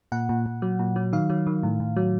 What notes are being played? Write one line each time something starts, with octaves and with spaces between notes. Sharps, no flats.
A#2 F#5
A#2
A#2
F#3
A#2
F#3
D#3 F5
F#3
D#3
A2
A2
F#3